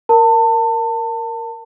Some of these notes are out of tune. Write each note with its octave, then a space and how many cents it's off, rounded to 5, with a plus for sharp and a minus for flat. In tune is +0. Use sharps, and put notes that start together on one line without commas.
A#4 +0 A5 +30